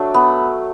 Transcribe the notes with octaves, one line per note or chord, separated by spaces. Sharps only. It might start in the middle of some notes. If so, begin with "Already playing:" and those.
Already playing: F#3 A3 D4
B3